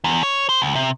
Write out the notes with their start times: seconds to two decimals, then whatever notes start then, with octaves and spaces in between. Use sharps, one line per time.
0.04 E2
0.23 C#5
0.49 C5
0.62 C#2
0.75 C3